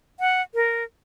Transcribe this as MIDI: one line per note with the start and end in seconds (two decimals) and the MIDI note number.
0.20 0.42 78
0.55 0.84 70